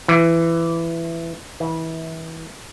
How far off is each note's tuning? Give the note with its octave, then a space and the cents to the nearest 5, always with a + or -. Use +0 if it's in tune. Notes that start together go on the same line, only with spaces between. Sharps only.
E3 +15
E3 -25